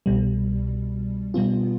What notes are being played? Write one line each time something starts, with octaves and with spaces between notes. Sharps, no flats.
C2 B2 G3
B2 G3 B3 F4